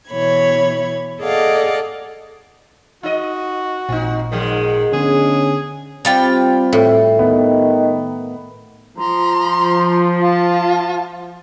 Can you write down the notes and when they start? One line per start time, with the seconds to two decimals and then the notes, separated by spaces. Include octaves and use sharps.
0.10 B2 E3 C#5 B5 G#6
1.21 G#4 A4 D5 D#5 F5 F#5
3.03 D#4 F#4 D#5
3.89 A1 A#2 C4 D#4
4.32 G#2 D#3 F3 G#3
4.93 D3 B3 C#4 D4 G#4
6.05 G3 C4 F4 G5
6.73 A2
7.19 D#3 B3
8.97 F3 A#5 C6
10.19 F4 A5